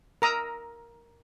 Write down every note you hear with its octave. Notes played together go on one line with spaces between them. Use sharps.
A#4 A#5 D#6 E6